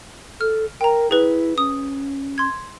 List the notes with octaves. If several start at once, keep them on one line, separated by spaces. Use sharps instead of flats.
A4 F6
A#4 G5 A#5
E4 G#4 B4
C#4 D#6
C6 G#6